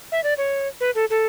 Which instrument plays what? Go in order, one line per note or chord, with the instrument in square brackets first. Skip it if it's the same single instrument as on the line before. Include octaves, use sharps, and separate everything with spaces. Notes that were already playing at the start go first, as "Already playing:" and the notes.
[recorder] E5
D5
C#5
B4
A4
A4